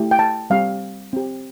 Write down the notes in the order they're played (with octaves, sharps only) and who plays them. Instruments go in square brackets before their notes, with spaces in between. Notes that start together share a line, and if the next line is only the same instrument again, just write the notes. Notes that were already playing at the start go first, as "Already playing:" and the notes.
Already playing: [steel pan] A3 E4 G4
G5
A5
G3 C4 G4 F5
C4 G4